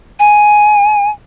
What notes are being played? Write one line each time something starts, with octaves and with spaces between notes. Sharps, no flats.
G#5